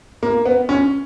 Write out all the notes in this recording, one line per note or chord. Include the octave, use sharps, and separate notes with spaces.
A#3
B3
C#4